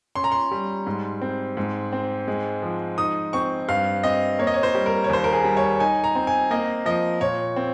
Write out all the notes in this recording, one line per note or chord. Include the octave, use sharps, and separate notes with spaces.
C#4 C6
A#5
C6
G3
G#2
C4
G#2
C4
G#3
F3
D#4 D#6
C4 C#6
G2 F5
C4 D#5
A#3 C#5
D#5
C#5
C5
G3
A#4
C#5
D#2 C5
A#4
G#4
G3
C#5
D#4 G#5
A#5
C4
G#5
A#3 D#5
F3 D#5
A#2 C#5
C4